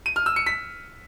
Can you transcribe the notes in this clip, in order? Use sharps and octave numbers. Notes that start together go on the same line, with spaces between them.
D#7
F6
E6
C#7
B6